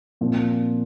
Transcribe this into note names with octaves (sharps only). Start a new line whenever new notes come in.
A#2 F3 C4